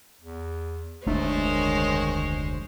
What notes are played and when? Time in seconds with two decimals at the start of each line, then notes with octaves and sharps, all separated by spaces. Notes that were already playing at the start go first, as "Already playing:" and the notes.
0.21 E2
1.06 F1 D2 G#3 A3 D4 C5 C#5
1.42 D#3